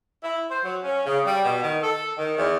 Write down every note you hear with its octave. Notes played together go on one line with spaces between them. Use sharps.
E4
C5
F#3
C#4
C#3
G3
B2
D#3
A4
D#3
E2